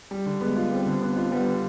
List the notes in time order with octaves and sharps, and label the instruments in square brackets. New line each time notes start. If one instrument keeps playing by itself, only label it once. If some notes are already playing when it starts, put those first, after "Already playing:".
[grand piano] G3
D3
[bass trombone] G#3 [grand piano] B3
[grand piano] F4
[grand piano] G3 [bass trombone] C4
[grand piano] D3
[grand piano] B3 [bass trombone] C4
[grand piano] F4
[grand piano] G3 [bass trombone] B3
[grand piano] D3